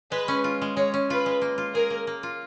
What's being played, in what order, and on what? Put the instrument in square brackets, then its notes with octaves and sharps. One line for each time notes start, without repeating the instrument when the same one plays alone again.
[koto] G#3 [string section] B4
[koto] C#4
F4
G#3
[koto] G#3 [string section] C#5
[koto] C#4
[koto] F4 [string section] B4
[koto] G#3
A#3
F4
[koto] G#4 [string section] A#4
[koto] A#3
A#3
F4